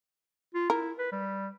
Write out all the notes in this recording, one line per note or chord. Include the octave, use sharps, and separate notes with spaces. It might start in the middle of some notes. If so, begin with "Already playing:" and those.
F4
E4 A#4
B4
G3